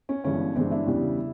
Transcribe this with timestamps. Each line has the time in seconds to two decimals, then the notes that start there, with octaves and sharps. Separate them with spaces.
0.09 C#4
0.24 G1 G2 E3 G#3 C#4
0.55 G1 G2 E3 G#3 C4 D4
0.71 D4 E4
0.87 E2 C#3 E3 G3